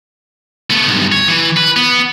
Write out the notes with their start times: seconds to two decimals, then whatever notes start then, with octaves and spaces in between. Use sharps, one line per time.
0.70 A3 B3
0.88 B1 G2
1.12 C#5
1.28 E3
1.57 B4
1.77 B3